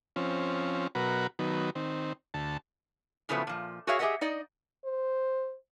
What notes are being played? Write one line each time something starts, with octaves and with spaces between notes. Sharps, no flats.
F3 C4 C#4
B2 F#3 A#4 B4 F#5
D#3 F#3 B3
D#3 C4
D2 A5
A2 C#3 F3 F#3 A3 B3
A#2 F3
F#4 G#4 A#4 C#5 E5 F5
G4 G#4 A#4 D#5 E5 F#5
D#4 D5 D#5
C5